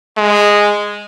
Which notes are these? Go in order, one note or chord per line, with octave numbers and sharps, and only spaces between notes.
G#3